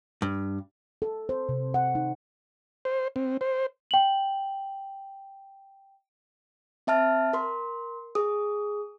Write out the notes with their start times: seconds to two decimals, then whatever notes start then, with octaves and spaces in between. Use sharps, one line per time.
0.22 G2
1.02 A4
1.29 C5
1.49 C3
1.74 F#5
1.95 D#4
2.85 C5
3.16 C4
3.41 C5
3.91 G5 F#7
6.87 C4 E5 A5 F6
7.33 A#4 C6
8.15 G#4 D#6